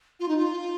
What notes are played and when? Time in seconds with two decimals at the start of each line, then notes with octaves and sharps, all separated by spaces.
0.20 F4
0.28 D#4
0.37 F4